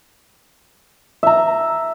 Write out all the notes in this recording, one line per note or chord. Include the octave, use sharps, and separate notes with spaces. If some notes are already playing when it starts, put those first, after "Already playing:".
E5 A#5